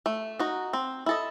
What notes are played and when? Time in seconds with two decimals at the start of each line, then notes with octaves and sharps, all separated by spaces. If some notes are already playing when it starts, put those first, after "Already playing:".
0.06 A3
0.39 D#4 F#4
0.73 C4
1.06 E4 A4 D#5